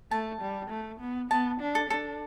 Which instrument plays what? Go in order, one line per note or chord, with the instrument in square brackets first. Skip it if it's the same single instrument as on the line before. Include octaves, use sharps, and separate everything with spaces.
[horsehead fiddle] A3 [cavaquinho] A5
[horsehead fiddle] G3
A3
B3
[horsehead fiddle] B3 [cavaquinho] A5
[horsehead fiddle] D4
[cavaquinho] A4
[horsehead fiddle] D4 [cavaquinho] A4